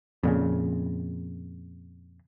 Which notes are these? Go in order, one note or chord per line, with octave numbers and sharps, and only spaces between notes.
F2 A#2 C#3